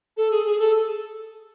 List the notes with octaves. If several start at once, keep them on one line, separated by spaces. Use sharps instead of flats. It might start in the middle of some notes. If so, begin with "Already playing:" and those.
A4
G#4
G#4
A4